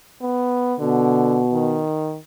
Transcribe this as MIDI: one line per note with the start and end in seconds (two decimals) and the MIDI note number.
0.21 0.75 59
0.80 1.84 47
0.80 1.42 50
1.53 2.18 51